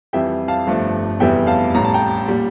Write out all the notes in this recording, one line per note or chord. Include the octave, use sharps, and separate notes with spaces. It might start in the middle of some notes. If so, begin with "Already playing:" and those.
F2 E3 G3 E5 G5
F5 A5
G1 G2 F3 A3
F1 E2 E3 G3 E5 G5
F5 A5
A1 A2 G3 A#5
A5
G5 A#5
A#2 G3